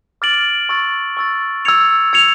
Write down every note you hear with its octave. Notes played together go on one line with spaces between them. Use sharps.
D6 F6 A6 D7 F#7
C#6 E6 A6
C#6 E6 A6
E6 G#6 C#7 F7
E6 G#6 C#7 F7